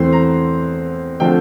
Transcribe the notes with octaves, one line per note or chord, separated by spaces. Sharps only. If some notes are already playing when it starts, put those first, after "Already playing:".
Already playing: E2 E3 A3 C4 C6
A#5
D3 F3 A3 C4 G5